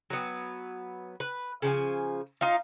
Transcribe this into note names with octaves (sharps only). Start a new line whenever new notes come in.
F#3 B3
B4
C#3 F3 G#5
D#4 F4 F5